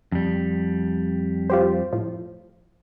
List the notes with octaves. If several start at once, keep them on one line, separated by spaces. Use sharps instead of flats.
F2 G3
F4 G4 C5
A2 F3